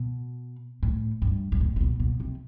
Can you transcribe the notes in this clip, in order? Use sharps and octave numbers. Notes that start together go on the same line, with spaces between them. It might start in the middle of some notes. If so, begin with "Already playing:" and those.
Already playing: B2
A2
G2
G2
A2
C3
B2
B2
C3